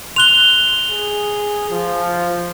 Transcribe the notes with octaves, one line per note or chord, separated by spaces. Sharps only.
C6 F#6 F7 G7
G#4
F3